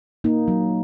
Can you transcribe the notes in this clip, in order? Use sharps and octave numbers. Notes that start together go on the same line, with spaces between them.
A#3 D#4
F#3